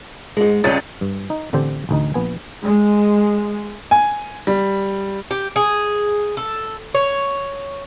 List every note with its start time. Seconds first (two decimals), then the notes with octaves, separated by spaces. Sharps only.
0.37 G#2 G#3
0.64 C#2 G3 C#4 D#5 A6
1.01 G2
1.30 D#4
1.53 A1 D3 C4 G4 C5
1.89 A1 D2 D#4
2.14 A#1 B3 G#5
2.63 G#3
3.91 G#5
4.47 G3
5.31 G4
5.56 G#4
6.37 A4
6.94 C#5